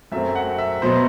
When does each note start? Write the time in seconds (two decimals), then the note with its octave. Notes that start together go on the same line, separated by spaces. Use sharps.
0.12 F#2 F#3 A3 C4 E5
0.35 F#5
0.58 E5
0.82 B2 F#3 B3 C5